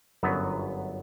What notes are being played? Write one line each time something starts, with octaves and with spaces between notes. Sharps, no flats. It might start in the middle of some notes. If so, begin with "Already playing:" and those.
G1 F#2 F#3 B3